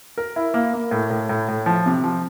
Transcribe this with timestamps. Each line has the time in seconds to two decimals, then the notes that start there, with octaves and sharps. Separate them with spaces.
0.18 A#4
0.36 E4
0.54 A#3
0.74 A#3
0.91 A2
1.10 A2
1.29 A2
1.49 A2
1.66 F3
1.86 C3
2.04 F3